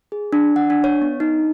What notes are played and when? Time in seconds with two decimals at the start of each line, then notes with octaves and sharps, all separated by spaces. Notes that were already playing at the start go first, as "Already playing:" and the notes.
0.12 G#4
0.33 D4
0.56 F#5
0.70 D4
0.84 C#5
1.02 B3
1.20 D#4